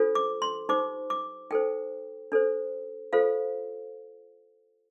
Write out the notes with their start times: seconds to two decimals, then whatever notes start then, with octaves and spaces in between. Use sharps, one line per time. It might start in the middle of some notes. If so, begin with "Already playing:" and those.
Already playing: D4 F4 A4 C5
0.15 D6
0.42 C6
0.69 D#4 G4 C5 D6
1.10 D6
1.50 D#4 A4 C5 G5
2.32 D4 A4 C5
3.13 F4 A4 C5 F5